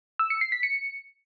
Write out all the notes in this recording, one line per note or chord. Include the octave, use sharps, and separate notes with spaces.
E6
C#7
C7
B6
C#7